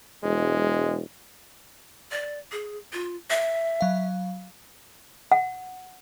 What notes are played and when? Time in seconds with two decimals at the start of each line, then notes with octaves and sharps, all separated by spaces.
0.24 E1 G#3
2.12 D5
2.52 G#4
2.93 F4
3.30 E5
3.81 F#3 F5
5.32 F#5